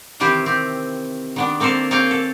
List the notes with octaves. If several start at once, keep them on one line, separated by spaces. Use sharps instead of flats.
C3 D#3 E3 G4 B4 C5
C4 G4
D#3 B3 D4
A#3 C4 A4 A#4 C5
A#3 C4 G#4 C#5 F5 G5
A4